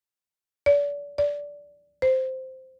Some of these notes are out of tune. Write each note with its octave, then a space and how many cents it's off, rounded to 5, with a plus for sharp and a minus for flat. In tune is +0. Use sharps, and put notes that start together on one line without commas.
D5 -35
D5 -15
C5 -5